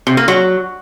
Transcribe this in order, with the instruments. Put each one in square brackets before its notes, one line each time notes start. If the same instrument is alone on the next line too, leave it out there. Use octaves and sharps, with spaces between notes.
[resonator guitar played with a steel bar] C3
A#3
F#3